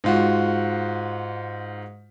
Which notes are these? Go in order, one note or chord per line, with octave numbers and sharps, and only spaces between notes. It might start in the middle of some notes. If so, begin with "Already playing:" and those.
G#2 F4 F#4